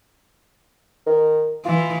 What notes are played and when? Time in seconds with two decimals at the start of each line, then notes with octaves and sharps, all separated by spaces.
1.06 D#3
1.65 E3 F4